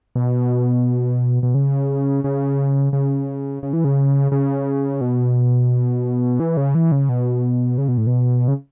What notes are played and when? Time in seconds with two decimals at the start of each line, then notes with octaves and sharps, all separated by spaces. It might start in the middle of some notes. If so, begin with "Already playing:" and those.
0.16 B2
1.43 B2
1.54 C#3
2.24 C#3
2.93 C#3
3.63 C#3
3.73 E3
3.84 C#3
4.32 C#3
5.01 B2
6.40 E3
6.57 C#3
6.75 E3
6.92 C#3
7.09 B2
7.78 C#3
7.88 B2
7.98 A2
8.07 B2
8.48 C#3